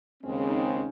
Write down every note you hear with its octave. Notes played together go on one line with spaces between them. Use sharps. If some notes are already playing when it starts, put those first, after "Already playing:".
D#2 C#3 G#3 C4 C#4
D#4
C#4